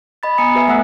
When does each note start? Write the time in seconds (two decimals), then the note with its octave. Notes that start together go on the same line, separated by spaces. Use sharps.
0.23 D#5 B5 A6
0.38 B3 G#5 A#5 D#6 C#7
0.55 G4 B4 E5 G#5
0.68 A3 E5 F#5 E6 F#6